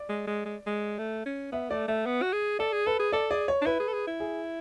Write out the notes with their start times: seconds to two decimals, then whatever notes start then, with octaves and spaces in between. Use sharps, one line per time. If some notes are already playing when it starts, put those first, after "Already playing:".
Already playing: D5
0.09 G#3
0.27 G#3
0.46 G#3
0.67 G#3
0.98 A3
1.26 C#4
1.52 B3 E5
1.70 A3 D5
1.88 A3 E5
2.06 B3
2.22 F#4
2.33 G#4
2.59 A4 D5
2.73 G#4
2.86 A4 B4
2.99 G#4
3.12 A4 D5
3.31 G#4 D5
3.48 C#5
3.62 D4
3.66 E4 B4
3.80 G#4
3.88 A4
3.93 G#4
4.07 E4
4.20 G#4